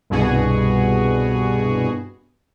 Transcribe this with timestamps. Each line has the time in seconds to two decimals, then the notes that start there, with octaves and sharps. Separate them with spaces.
0.10 C2 G2 B2 B3 F#4 G#4